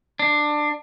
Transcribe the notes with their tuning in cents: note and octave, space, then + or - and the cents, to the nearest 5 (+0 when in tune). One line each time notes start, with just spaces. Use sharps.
D4 +15